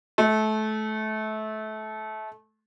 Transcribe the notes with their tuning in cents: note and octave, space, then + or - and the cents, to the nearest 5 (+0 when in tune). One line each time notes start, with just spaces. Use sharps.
A3 -25